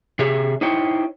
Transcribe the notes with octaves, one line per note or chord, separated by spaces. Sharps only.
C3 G#4 C#5 E5
D#4 E4 C5 C#5 G5